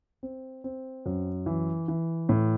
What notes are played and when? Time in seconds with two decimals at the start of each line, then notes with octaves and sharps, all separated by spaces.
0.23 C4
0.64 C4
1.06 F#2
1.46 E3
1.88 E3
2.29 A2